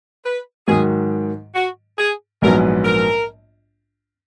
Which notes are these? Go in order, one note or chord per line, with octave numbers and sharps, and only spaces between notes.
B4
G#2 D#3 F#3 G#4
F#4
G#4
A#1 G#2 F#3 B3 A#4
A#4